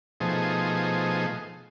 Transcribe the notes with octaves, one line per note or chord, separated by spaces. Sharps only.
B2 F3 A3 D#4 G#4 C5